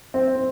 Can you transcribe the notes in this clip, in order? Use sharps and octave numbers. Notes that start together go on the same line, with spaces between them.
C4
C4